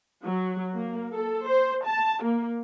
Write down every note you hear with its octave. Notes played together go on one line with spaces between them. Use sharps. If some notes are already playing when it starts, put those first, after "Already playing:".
F#3
A#3
A4
C5
A5
A#3